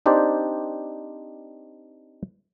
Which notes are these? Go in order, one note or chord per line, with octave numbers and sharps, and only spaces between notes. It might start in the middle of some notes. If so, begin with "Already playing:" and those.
C4 D4 D#4 G4 C5 D5